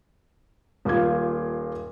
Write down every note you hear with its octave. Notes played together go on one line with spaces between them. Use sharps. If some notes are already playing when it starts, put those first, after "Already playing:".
D#1 A#3 F4 G#6